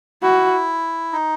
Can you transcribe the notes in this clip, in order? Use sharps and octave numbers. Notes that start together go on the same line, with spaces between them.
E4 F#4
D#4